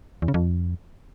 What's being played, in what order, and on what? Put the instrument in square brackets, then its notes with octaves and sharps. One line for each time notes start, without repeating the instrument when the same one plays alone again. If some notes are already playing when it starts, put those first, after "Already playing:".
[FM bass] E2
C#3
F2